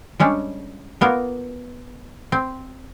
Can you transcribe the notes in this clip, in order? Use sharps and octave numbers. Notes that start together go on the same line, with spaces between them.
G3 G#3 C#4 D4
A#3 B3 F4 A#4
C4